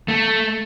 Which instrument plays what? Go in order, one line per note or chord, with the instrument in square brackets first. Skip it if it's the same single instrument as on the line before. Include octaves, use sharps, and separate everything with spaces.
[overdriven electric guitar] A3